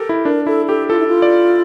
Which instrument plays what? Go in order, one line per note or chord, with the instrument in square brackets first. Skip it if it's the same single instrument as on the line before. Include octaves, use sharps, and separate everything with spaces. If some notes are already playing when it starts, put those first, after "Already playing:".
Already playing: [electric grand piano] G4 A4 A#4
E4
[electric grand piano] D4 [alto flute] A#4
[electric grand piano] E4 [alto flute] A4
[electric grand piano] G4 [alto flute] A4
[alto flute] F4 [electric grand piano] A4
[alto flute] E4
F4
[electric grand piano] D5